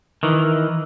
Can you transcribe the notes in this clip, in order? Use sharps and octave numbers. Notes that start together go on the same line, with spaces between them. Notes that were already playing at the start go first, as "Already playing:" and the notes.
D#3 E3